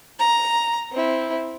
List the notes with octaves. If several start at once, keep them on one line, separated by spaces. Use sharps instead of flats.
A#5
C4 E4